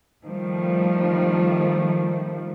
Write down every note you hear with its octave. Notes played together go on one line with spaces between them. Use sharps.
D#3 F3 G3 A3